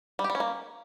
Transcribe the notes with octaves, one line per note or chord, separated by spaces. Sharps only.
G3
G4
G3
C#4
A#3